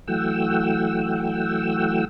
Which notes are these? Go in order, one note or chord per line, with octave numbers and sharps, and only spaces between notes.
E3 F#3 A3 F#5 G5 E6